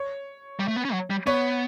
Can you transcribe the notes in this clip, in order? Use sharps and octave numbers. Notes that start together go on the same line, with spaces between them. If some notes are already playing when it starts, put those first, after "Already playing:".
Already playing: C#5
G3
A3
B3
C#4
F#3
G3
B3 C#5